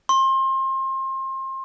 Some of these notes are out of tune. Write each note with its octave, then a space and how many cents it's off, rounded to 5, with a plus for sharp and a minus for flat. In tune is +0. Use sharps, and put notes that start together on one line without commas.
C6 +30